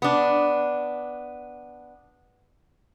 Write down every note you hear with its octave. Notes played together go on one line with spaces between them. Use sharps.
B3 D4